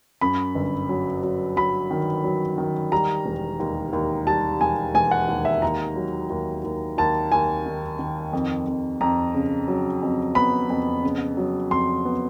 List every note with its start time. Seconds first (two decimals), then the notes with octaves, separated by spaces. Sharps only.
0.21 F#2 B5
0.55 G1
0.89 F#3
1.23 F#3
1.56 F#3 B5
1.91 D#3
2.24 F#3
2.58 D#3
2.92 G3 A#5
3.26 E1
3.60 D#2
3.93 D#2
4.27 G3 A5
4.61 E1 G#5
4.94 E1 G#5
5.11 F#5
5.28 D#2
5.45 E5
5.62 D#2 A#5
5.96 F#3
6.30 D#2
6.64 D#2
6.98 D#2 A5
7.32 D#2 G#5
7.66 D#3
7.99 D#3
8.33 F2
8.67 F2
9.01 F2 A#5
9.34 C#3
9.68 F#3
10.02 F2
10.35 B3 B5
10.70 F2
11.03 C#3
11.37 F#3
11.71 F2 C6
12.05 B3